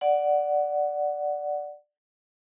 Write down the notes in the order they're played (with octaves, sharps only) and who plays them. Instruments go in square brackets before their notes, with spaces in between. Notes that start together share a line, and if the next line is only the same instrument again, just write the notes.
[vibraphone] D5 F#5